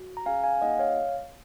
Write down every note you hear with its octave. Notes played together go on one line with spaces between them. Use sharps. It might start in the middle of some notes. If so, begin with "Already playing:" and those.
Already playing: F#4
A#5
C#4 G#4 F5 G#5
F5 G#5
A#3 D#4 G#4 D#5 F#5
C#5 F5